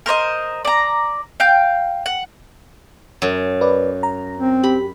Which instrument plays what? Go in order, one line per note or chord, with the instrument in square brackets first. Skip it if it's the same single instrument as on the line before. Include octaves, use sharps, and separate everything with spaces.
[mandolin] A#4 C5 C#5 D#5
D5 A#5
F5 G5 G6
F#5
[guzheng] F#2
[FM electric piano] B4 D5
A#5
[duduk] C4
[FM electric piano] G4 [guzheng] B5